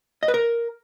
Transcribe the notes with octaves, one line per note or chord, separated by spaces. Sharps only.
D#5
B4
A#4